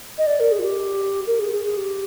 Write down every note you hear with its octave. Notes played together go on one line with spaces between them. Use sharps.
D#5
D5
A#4
G#4
F4
G4
A#4
G#4
G#4
G#4
G4